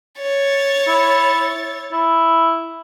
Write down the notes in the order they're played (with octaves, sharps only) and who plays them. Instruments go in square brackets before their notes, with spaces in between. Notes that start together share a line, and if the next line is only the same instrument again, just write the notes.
[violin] C#5 A6
[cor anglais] E4
E4